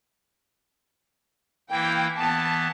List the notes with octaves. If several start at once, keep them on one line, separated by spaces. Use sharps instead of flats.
E3 A#3 E4 G5
E3 B3 A5